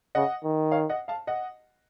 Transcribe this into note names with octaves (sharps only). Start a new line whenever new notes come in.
C#3 D#5 F#5
D#3
C#5 F5
D#5 F#5
F5 A5
D#5 F#5